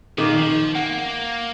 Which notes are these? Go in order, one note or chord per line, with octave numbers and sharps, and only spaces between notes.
A#2 D#3 D6
F3
A#3 F#5